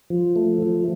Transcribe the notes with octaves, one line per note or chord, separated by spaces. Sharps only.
F3
A3
F3